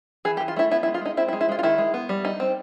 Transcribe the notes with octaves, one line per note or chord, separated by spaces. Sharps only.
E3 G#4
G4
E3
F4
A3 E4
B3 E4
E4
G#3
F4
G#3 D#4
C4 E4
E4
G#3
E4
G#3 F4
F4
D#3 E4
G#3
B3
G3
D#4
C4